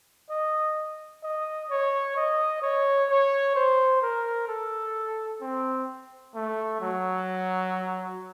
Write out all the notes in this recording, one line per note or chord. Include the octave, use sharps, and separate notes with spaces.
D#5
D#5
C#5
D#5
C#5
C#5
C5
A#4
A4
C4
A3
F#3